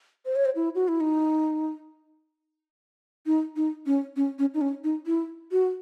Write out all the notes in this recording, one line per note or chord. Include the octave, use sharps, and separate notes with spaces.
C5
C#5
C5
E4
F#4
E4
D#4
D#4
D#4
C#4
C#4
C#4
D#4
C#4
D#4
E4
F#4